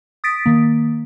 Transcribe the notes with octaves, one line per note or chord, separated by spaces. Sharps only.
D#6 A6 B6 D7
D#3 A#3